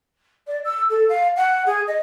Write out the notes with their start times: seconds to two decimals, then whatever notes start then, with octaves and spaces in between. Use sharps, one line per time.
0.47 D5
0.65 E6
0.90 A4
1.09 F5
1.36 F#5
1.66 G#4
1.87 D#5